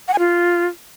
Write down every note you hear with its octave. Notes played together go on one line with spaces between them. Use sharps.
F#5
G#5
F4